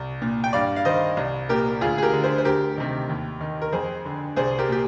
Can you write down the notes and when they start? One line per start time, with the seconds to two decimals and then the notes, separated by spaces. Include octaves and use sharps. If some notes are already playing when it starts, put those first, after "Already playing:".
Already playing: C2
0.22 A#2
0.44 G5
0.53 G2 D5 F5
0.76 F5
0.85 D#3 C5 D#5
1.17 C2
1.49 A#2 G4 A#4
1.81 D2 F4 G#4
1.98 G#4
2.02 G4 A#4
2.13 D3
2.24 G#4 C5
2.38 C5
2.45 D2 G4 A#4
2.77 C3 D#3
3.09 D#2
3.40 D#3
3.62 A#4
3.72 F2 G#4 C5
4.05 D3
4.36 C2 G#4 C5
4.59 G4 A#4
4.69 A#2 G4